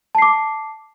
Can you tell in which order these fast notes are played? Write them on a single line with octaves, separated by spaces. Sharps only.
A5 C7 D6